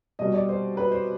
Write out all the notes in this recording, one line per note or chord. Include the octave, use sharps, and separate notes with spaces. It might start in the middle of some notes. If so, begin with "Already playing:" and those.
B2 G3 D#5
D5
C5
B4
C5